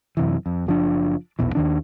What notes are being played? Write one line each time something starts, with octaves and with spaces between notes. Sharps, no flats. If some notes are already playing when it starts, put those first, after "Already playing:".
F#2 C3 E3
F2
F#1 F3 D4
A#1 E2 B2 E3
D#2 D#3 D4